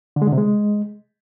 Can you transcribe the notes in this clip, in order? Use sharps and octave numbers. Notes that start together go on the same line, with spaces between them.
D3
G#3
D3
C3
G#3